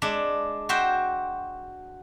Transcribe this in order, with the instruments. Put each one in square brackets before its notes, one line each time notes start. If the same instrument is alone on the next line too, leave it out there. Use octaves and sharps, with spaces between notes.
[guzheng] G#3 D4 E5
F#4 C5 E5 G5